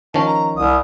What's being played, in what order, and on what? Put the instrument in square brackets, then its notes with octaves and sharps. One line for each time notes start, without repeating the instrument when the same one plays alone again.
[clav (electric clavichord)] D#3 F3 C#4 [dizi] A5
[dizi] A#5
[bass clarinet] C2 [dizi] D#6